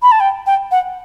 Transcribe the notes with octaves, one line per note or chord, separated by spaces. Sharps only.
B5
A5
G5
G5
F#5